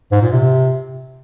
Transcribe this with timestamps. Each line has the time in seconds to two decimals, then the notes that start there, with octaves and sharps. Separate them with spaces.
0.12 G#2
0.22 A#2
0.32 C3